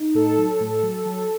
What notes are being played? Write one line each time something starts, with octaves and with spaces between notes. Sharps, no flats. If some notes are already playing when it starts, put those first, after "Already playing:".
Already playing: D#4
A2 A4
F#3
A2
F#3
F#3